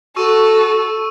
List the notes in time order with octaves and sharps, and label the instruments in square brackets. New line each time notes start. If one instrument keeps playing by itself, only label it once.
[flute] F#4 [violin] A4 [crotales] C#6 E6 D#7